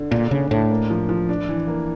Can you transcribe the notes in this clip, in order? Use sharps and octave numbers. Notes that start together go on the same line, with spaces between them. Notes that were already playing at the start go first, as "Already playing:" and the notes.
Already playing: D3
A#2 D4
C#3 D4
A2 D4
A#3
F3
F3
D4
E3
A#3